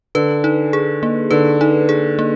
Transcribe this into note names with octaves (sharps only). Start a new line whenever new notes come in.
D3 B4
D#4
G#4
A#3
D3 B4
D#4
G#4
A#3